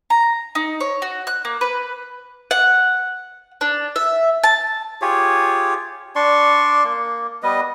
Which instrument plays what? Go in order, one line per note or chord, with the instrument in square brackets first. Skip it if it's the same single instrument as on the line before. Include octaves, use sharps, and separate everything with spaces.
[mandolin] A#5
D#4
C#5
F#4
F#6
A#3
B4
F#5
D4
E5
A5
[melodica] F4 G4 G#4 C#5
D4 D5 C6 C#6
A#3
G3 B3 B4 D#5